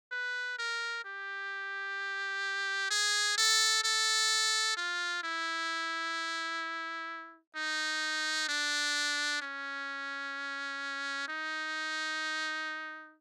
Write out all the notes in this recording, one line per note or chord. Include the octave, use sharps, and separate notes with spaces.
B4
A#4
G4
G#4
A4
A4
F4
E4
D#4
D4
C#4
D#4